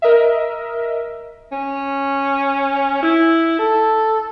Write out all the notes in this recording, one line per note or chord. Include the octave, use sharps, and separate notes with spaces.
A#4 D#5 E5
C#4
E4
A4